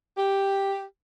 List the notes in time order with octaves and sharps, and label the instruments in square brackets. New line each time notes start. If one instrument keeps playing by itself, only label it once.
[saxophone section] G4